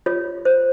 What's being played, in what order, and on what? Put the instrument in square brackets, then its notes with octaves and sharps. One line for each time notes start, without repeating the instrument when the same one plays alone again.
[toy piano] F4 C#5
C5